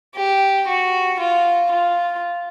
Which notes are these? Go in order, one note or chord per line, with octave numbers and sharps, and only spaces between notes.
G4
F#4
F4
F4